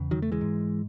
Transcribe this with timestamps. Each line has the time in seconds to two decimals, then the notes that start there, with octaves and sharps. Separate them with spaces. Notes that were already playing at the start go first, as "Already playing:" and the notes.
Already playing: E2 C#3
0.11 D#3 F#3
0.22 A3
0.32 E3 G#3
0.41 G#2